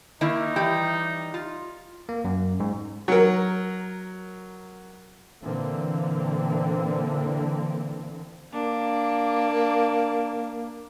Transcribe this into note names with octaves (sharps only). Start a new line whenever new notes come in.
D#3 A#3 D#4 E4
E3 G3 G4
F4
A#3
F#2
G#2
F#3 A#4
A#2 D3 E3 A#3 C4
A#3 D4